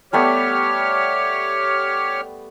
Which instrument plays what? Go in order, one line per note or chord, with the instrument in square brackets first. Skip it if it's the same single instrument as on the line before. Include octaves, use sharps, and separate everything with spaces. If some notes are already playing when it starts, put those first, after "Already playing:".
[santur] G3 A3 B3 [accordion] G4 C#5 F6